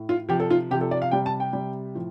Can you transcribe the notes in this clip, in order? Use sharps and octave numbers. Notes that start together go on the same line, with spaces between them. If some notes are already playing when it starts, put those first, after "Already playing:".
Already playing: A2
F4
C3 F3 G4
A4
F4
C3 F3 G4
A4
D5
F5
C3 G3 G5
A5
G5
C3 G3
A2 F3